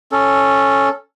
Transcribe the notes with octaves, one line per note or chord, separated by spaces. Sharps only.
C#4 A4